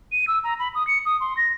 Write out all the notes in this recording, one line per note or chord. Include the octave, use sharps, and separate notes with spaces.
D#7
E6
A#5
B5
D#6
C#7
D#6
C6
A#6